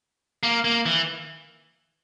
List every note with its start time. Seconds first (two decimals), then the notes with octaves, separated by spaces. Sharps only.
0.43 A#3
0.65 A#3
0.86 E3